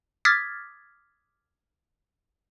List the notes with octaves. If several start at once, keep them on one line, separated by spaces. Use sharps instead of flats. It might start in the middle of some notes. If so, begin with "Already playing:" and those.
D6 D#6 F6 G#6 A6 B6